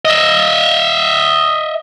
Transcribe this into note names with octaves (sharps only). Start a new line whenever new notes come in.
D#5 E5